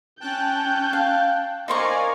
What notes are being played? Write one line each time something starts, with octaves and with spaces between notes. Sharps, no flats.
C#4 G5 A5 F#6 G6
F5
D#4 A#4 C5 D5 F5 G#5 C#6